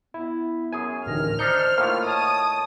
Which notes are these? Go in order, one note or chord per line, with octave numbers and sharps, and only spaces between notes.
B3 E4
F#2 G#4 G#5
A1 D2 D#3 A#4 F6
D4 D#4 C5 G6 C#7
A2 D#3 A#3 F4
C#5 A5 D#6